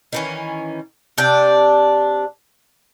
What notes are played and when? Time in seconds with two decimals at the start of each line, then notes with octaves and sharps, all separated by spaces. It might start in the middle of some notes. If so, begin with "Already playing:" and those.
0.13 D#3 E3 C#4
1.18 C3 D4 G5